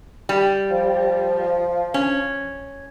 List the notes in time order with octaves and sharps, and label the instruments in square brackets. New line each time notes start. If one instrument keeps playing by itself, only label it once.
[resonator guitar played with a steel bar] G3
[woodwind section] F3
[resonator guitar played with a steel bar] C#4